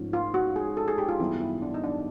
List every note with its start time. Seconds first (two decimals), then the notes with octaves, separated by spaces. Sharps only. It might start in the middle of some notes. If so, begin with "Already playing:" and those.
Already playing: G#2 F3 A3 C#4
0.13 F4
0.34 F#4
0.56 G#4
0.77 A4
0.88 G#4
0.98 G4
1.09 F4
1.19 F#2 D#3 G3 B3 E4
1.40 E4
1.62 D4
1.74 D#4
1.84 D4